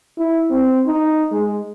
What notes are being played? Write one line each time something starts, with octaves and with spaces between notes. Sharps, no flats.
E4
C4
D#4
G#3